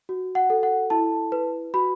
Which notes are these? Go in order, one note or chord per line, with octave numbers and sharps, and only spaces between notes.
F#4
F#5
A4
F#5
E4 A5
B4
F#4 B5